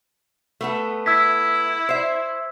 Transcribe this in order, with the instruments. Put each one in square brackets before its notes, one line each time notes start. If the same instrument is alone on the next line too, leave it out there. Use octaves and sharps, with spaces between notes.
[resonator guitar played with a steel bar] A3 B3 A4
[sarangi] E4 [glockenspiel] E6 G#6 B6
[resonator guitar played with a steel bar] C5 E5